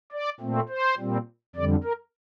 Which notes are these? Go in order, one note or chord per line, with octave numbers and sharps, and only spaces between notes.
D5
A#2 A3 C4
C5
A#2 G3 C4
F2 D3 G3 D5
A#4